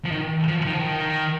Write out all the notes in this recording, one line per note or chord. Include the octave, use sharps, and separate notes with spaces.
F3
D#3
F3
D#3
F3
D#3